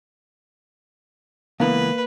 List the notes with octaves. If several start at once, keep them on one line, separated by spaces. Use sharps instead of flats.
C#2 E3 A#3 B3 B4